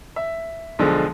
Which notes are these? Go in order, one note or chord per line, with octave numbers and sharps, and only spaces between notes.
E5
B1 D3 F3 G#3